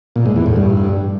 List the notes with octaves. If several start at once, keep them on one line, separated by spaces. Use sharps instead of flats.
A#2
G#2
E2
A2
G2